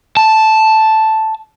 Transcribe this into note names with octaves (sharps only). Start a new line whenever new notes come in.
A5